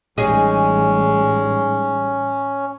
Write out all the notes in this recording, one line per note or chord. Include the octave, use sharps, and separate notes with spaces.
A1 G3 G#3 C#4 D#4 G#4